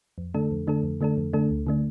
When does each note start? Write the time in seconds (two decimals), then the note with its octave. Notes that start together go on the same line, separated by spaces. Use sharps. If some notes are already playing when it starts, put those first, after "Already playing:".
0.18 F2
0.34 D3 A3 D4 A4
0.51 F2
0.67 D3 A3 D4 A4
0.83 F2
1.01 D3 A3 D4 A4
1.17 F2
1.33 D3 A3 D4 A4
1.50 D2
1.67 D3 A3 D4